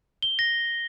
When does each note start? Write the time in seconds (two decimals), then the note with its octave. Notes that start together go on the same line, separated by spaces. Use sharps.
0.22 G7
0.39 A#6